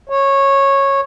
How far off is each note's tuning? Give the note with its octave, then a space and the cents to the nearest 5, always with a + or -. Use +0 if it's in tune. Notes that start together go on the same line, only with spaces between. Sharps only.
C#5 -15